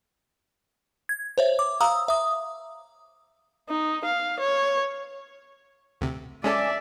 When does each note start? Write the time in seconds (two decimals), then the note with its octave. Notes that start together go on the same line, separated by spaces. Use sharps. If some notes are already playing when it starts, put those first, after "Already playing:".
1.09 G#6
1.38 C5 C#5 E5
1.59 D6
1.81 F5 A#5 D#6 E6
2.08 E5 D#6
3.69 D#4
4.05 F5
4.40 C#5
6.01 D2 C3
6.44 G#3 C#4 A4 D5 E5 G#5 A5 D6